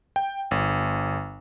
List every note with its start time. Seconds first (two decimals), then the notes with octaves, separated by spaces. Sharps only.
0.16 G5
0.51 G1